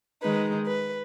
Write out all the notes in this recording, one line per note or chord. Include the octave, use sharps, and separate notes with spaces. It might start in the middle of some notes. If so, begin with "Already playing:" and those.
D#3 G#3 D#4 B4
B4